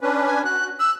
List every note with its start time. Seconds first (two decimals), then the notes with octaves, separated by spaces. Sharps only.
0.01 C#4 D4 B4
0.27 G#5
0.44 F#4 F#6
0.79 E6 F#6